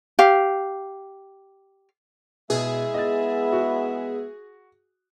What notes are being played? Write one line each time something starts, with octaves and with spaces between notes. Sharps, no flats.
G4 F5
B2 G#3 E4 G#4 E5
B3 D#5 A6
F#4